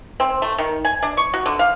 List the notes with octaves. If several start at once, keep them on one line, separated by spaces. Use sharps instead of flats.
C4
A3
D#3
G#5
D4
C#6
F#4
D3
F5